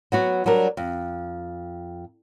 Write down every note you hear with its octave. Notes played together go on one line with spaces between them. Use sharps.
F#3 B3 F#4
F#3 G3 D4 A#4
F2